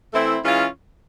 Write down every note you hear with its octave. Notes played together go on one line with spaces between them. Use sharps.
E3 A3 C4 E4
E3 G#3 C#4 F4